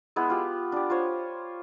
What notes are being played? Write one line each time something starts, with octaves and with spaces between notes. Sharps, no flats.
G#3 B3 E4
F4 G4
D4 G4
F4 C5 C#5